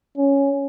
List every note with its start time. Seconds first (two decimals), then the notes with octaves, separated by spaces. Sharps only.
0.17 C#4